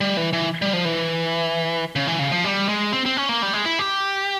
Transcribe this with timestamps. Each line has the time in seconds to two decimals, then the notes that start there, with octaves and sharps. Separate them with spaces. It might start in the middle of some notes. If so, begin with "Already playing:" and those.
0.01 G3
0.17 E3
0.33 E3
0.62 G3
0.73 F3
0.85 E3
1.96 C#3
2.07 E3
2.19 C#3
2.32 F3
2.44 G3
2.69 G#3
2.93 C4
3.06 C4
3.17 C#4
3.29 A#3
3.42 G3
3.53 G#3
3.66 E4
3.79 G4